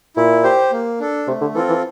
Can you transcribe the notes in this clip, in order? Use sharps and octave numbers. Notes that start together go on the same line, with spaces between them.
A#2 E4
G4 C5
A#3
D4 A4
C3 A3
D3
E3 C4 F4 A4
E3